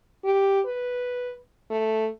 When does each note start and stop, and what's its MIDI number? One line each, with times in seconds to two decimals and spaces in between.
0.24 0.61 67
0.67 1.34 71
1.71 2.09 57